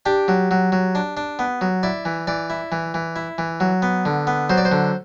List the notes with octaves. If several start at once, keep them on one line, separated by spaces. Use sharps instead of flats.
D4 G4
F#3
F#3
F#3
D4
D4
B3
F#3
E4 D5
E3
E3 D5
E4
E3
E3
E4
E3
F#3
B3
D3
B3
F#3 C5
D5
C5
D3